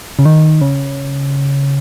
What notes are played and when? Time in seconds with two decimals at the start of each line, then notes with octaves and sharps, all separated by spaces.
0.19 C#3
0.25 D#3
0.61 C#3